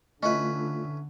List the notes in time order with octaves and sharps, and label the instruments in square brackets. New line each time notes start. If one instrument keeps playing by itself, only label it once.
[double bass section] D3 [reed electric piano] A3 F4 [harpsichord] C#4 E4 B4 [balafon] D#5